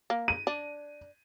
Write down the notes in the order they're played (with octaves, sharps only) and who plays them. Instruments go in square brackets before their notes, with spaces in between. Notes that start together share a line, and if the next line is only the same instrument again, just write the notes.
[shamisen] A#3
[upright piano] D#7
[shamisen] D4